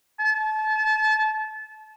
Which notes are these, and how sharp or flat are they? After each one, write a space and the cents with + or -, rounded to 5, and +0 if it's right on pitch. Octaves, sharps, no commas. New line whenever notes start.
A5 -30